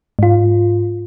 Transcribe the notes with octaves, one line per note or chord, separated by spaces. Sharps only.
G#2 F4